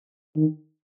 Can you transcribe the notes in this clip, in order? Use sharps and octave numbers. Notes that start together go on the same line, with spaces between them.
D#3